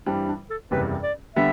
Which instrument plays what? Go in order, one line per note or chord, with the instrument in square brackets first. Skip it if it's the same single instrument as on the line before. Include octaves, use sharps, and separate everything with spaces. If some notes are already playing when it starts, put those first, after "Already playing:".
[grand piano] G2 E3 G3 C4 [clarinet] D4
[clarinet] D4
A4
[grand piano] F#1 E2 C3 E3 G3 [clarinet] B4
[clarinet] D5
[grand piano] D3 G3 B3 [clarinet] E5